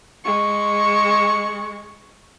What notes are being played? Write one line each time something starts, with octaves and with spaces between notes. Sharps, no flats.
G#3 C#6